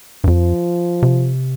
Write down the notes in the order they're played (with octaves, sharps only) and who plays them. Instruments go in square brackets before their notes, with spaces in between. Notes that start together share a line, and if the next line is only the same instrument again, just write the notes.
[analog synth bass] G2
[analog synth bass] F2 [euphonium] F3
[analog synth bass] C3